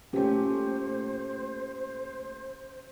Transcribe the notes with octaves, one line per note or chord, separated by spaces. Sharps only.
A#2 A3 C#4 G4 C5